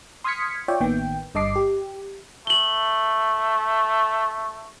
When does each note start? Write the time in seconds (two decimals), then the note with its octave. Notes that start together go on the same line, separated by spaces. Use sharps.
0.24 C6 D#6 F6 G#6 B6 C#7
0.68 F4 C#5 D5 E5 G5
0.80 A1 D#3 A#3 B3 G5
1.35 G1 G2 D#5 A5 D6 C7
1.56 G4
2.47 A3 F#7 G7